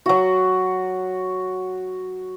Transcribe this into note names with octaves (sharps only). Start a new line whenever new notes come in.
F#3 F#4